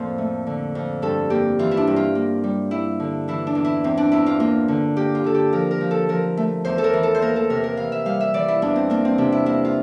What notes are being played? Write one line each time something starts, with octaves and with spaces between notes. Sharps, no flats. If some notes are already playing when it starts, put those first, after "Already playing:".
Already playing: F2 A2 A#3 C5 D5
A3
D3
F2
G2 A4
A#3 G4
E3 F4
E4
D4
G2
F4
A#3
G3
G3 E4
D3
E3 E4
D4
E2
E4
E2 C4
D4
E2 E4
F4
A#3 F4
D3
A#3 G4
F4
D3 A4
G4
F3 A#4
A#4
F3
A4
F3 A#4
A3
E2 C5
A4
A#4
E3
A4
C5
A#3 A#4
A4
C3 A#4
A#4
E3 F5
E5
G3 F5
E5
E3 D5
E4
E2 D4
C4
A#3 D4
C4
C3 D4
E4
A#3 E4
F4